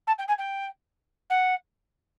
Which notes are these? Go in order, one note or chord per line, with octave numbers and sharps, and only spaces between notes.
A5
G5
G#5
G5
F#5